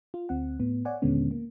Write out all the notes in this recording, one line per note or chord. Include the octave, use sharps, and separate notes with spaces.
F4
D2 C4 F#5
A2 B3
C#5 D5 F#5 G#5
D#2 A#2 D3 G#3 B3 C#4
A#3